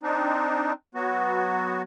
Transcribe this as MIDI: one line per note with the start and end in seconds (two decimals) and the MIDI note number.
0.03 0.73 60
0.03 0.73 62
0.03 0.73 63
0.95 1.82 54
0.95 1.82 59
0.95 1.82 66